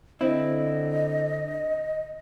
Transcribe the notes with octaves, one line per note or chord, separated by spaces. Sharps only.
D3 C4 E4 D#5